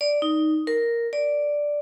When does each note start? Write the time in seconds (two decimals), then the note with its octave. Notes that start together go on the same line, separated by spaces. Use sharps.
0.01 D5
0.22 D#4
0.67 A#4
1.13 D5